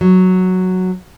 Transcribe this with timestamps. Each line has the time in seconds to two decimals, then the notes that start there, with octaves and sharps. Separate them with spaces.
0.01 F#3